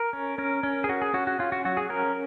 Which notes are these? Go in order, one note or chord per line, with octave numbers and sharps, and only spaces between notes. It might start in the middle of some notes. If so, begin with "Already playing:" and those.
Already playing: A#4
C#4
C#4 A#4
C#4
G#4
C#4 F#4
G#4
C#4 F#4
F#4
C#4 F4
F#4
F#3 F#4
G#4
C#4 A#4